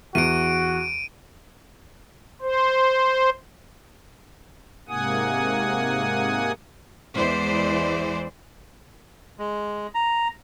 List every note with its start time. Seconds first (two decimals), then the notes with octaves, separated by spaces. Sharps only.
0.15 E2 F#4 D7 D#7
2.41 C5
4.88 G#2 C3 A#3 F#5 G#5 D#6
7.16 E2 E3 G#3 C5 D5
9.39 G#3
9.95 A#5